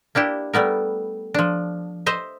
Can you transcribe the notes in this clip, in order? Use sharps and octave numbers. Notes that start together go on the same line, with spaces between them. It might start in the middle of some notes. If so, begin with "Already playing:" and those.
A#3 D4 E4 G4
G3 A3 B3 A#4
F3 D4
C5 D#5 E5